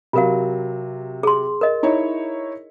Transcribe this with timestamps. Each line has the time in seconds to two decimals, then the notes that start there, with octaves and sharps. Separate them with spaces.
0.13 C3 F#3 F4 A#4 F5
1.23 G#4 C6
1.61 A#4 D#5
1.83 D#4 E4 C#5